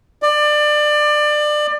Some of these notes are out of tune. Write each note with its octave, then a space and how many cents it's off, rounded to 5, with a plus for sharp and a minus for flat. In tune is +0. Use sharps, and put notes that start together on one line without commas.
D5 +25